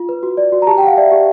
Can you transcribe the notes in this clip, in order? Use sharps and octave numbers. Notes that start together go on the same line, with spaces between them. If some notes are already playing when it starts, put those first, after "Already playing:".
Already playing: F4
B4
F#4
D5
F#4
A#5
G4 A5
G5
G4 F5 F#5
D5 E5
G4